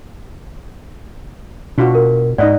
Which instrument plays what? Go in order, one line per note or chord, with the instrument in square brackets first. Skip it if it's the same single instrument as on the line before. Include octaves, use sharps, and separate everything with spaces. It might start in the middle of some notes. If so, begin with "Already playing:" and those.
[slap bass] B2 [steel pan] D4 F4 F#4
[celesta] A#4
[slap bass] G#2 [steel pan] D#4 D#5 F#5 [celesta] D5